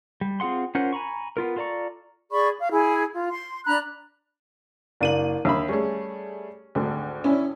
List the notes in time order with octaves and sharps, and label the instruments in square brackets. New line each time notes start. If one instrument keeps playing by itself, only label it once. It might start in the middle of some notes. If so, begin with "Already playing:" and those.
[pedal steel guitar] G3
C4 F4 G#4 F#5 C6
C#4 F4 A#4 C5 F#5
G#5 A#5 B5 C#6
B3 F4 A#4
F4 A4 D5 A#5 C#6
[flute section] G#4 D5 B5 C#6
F5
E4 G#4 G#5
F4
C6
D4 A#5 B5 F#6
[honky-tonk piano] F#1 D#7 F#7 [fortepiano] A#3 D4
[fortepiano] D#2 E5 B5 [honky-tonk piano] D3
[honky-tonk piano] G3 A3 G#4 [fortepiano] C#4
[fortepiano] G#1 D3 [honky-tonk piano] D2
[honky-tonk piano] C#4 D4 E4